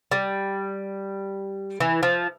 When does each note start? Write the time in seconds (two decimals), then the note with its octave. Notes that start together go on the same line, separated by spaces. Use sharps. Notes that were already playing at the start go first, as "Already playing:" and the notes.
0.12 G3
1.80 E3
2.03 F3